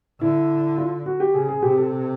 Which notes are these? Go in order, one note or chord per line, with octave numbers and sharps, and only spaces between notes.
D3 E4
F4
F#4
G4
C#3 G#4
G#4
C3 G4
A4